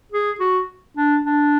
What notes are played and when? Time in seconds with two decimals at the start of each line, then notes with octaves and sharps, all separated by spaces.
0.12 G#4
0.40 F#4
0.97 D4
1.25 D4